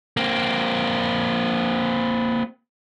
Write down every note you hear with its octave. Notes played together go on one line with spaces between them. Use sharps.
A#3 C4